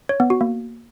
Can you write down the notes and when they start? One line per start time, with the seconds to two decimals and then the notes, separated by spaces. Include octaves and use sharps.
0.09 C#5
0.20 B3
0.30 F#4
0.41 A#3